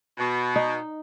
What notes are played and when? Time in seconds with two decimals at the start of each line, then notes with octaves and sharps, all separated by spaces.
0.18 B2
0.56 D#4